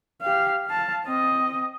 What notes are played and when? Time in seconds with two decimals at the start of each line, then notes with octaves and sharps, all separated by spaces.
0.22 G4 F5
0.67 F5 A5
1.06 C4 D#5